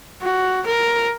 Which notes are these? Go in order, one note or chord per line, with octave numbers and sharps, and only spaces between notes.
F#4
A#4